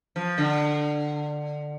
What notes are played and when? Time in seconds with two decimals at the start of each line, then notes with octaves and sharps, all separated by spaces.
0.16 F3
0.38 D3